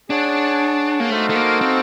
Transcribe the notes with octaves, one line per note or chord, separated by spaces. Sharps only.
D4 G#4 C#5 F#5 A5
A#3
A3 D#4 F#4 A4 C5 F5
A3
A#3
C4